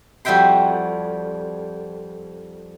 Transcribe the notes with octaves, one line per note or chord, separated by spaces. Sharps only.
F2 G3 F#4 E5 G5 C6